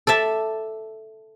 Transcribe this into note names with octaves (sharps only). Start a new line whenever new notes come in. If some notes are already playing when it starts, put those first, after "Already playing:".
A4 D5 E5 A5